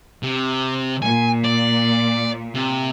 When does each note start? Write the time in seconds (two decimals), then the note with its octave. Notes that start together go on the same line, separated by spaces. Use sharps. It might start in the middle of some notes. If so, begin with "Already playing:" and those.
0.23 C3
1.02 A#2 G#5
1.44 D5
2.55 C3